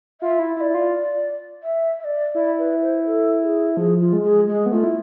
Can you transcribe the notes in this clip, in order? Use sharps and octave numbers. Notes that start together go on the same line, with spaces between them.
F4 E5
E4
E4 D5 E5
F4
E5
E5
D5
E4 D5
B4
C5
A4
G#4
F3 G#4
F4
G#3
G#4
G#3 G#4
B3
A3 F4
E4